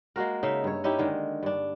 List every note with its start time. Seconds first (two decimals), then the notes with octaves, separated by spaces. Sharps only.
0.16 G#3 A#3 F#4 A#4
0.43 C#3 D#4 E5
0.64 G2 C#5
0.84 C#4 D#4 E4 G4
0.99 D3 D#3 G#3
1.43 G2 D4